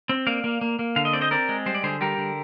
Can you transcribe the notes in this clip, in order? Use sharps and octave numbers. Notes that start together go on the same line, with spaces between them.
C4
A#3 D5 F5
A#3
A#3
A#3
D3 F5
D#5
C4 D5
C5 D#5
C4 A#4 D5
G#3
G3 C5
D5
D3 G#4 C5
G3 G4 A#4
D3